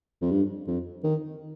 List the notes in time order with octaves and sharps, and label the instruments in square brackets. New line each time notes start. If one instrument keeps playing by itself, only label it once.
[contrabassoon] F2
G2
F2
D#3